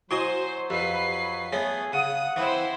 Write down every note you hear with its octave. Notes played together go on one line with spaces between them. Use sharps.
F#3 E4 F#4 C5 D#5 G#5 C6
F2 G4 B4 C7
A3 B3 G#4 C#5
C#3 F#5 D#6
E3 C4 E4 C5